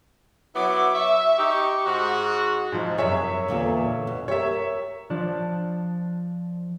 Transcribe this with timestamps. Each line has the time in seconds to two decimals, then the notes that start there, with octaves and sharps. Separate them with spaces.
0.55 F#3 B3 E4 D6
0.94 E5 C#6
1.38 D#4 G4
1.85 G#2 F#4
2.72 G#2 F3
2.98 F#2 C3 G#4 C#5 E5
3.48 E2 A#2 D3
4.07 B2
4.28 G4 A#4 C#5 E5
5.10 F3 D4